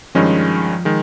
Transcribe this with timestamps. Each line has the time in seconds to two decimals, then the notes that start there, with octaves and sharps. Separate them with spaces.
0.15 G2 D#3 F3 G#3 C#4
0.85 D#3 G#3